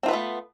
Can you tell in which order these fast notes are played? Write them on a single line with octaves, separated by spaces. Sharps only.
C4 F4 B4 B3 A3